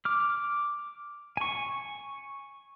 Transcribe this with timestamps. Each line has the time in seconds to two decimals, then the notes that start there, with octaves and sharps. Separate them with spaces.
0.05 D6 F6
1.37 G#5 C#6